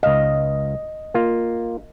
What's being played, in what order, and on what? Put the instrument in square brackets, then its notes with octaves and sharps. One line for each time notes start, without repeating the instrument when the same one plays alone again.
[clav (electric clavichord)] C#2 F5 [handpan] D#5
[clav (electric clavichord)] A#3 F4